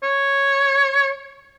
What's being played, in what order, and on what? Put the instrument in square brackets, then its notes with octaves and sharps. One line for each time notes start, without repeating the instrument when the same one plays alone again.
[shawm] C#5